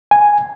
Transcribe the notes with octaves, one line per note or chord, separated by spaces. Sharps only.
G#5